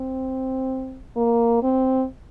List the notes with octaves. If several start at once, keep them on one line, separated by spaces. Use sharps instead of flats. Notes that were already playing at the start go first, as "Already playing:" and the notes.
Already playing: C4
A#3
C4